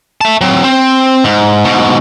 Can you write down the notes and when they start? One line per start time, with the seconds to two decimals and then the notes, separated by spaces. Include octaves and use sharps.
0.21 E5 A5
0.41 F#3 C4
0.64 C4 C5
1.24 G#2
1.65 G#2 B2